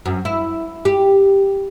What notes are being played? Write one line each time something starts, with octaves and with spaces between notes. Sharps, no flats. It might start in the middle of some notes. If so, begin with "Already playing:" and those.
F#2
E4
G4